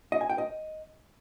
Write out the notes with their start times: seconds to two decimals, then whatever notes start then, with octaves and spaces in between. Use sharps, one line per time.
0.12 D#5
0.21 G#5
0.29 G5
0.38 D#5